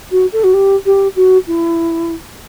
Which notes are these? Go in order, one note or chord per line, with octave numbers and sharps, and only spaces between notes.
F#4
A4
F#4
G4
G4
F#4
E4